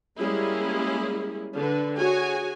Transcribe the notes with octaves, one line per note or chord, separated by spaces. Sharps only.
G3 G#3 A#3 C#4 E4 G#4
D3 B4
F#4 G#4 C#5 G#5